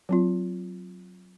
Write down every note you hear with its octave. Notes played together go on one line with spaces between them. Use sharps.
F#3 C4 F4